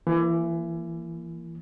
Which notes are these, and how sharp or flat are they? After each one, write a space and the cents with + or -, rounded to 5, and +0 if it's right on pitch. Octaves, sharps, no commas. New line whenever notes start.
E3 +30 A#3 +0